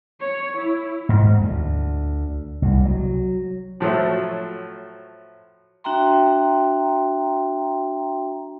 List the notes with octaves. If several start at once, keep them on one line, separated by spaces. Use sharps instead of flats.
C#5
E4
G#2
D2
C2
F#3
A2 F3 F#3 A3
D4 F#4 E5 G5 A#5 C6